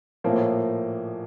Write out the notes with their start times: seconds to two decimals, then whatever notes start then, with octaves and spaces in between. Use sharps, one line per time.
0.24 A#1 A2 F3 A#3